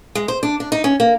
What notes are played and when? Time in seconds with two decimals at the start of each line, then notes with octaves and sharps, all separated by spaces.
0.15 G#3
0.28 C5
0.43 D4
0.60 D4
0.72 D#4
0.84 C#4
1.00 A#3